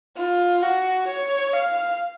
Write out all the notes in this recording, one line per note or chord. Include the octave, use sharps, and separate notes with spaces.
F4
F#4
C#5
F5